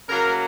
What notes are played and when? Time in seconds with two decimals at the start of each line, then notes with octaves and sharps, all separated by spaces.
0.08 C#3 F#3 A#3 A#4